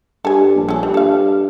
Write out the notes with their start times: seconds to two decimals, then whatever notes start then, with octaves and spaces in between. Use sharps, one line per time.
0.25 G2 A4 G#5
0.56 A#1
0.69 C#4 A4
0.83 G2 G3
0.94 A4 F5